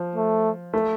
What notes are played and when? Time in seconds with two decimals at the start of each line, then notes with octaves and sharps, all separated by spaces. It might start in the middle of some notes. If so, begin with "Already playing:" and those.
Already playing: F3
0.16 A3
0.73 A3